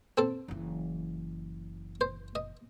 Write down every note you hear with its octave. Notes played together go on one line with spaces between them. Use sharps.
C4 A4
F#1 E3
C5
D#5